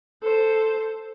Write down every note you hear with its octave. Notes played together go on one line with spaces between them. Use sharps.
A4 C5